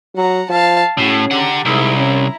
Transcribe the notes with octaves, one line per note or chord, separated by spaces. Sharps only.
F#3 F#5 A#5
F3 F5 A5
A2 C#4 F#4 G#4
D3 G4 F#5 A#5
C2 G#2 E4 A#5
C#4